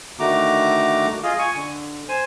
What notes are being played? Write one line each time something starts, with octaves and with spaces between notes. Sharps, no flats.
D3 D#3 A3 F#4 A#5 D6
F4 G#4 D#5 F5
G#5 C#6
D3
C5 G#5